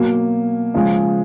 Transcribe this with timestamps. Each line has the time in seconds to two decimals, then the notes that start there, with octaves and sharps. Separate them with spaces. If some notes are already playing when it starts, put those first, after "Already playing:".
Already playing: B2 F#3 A#3
0.74 C#3 F3 G#3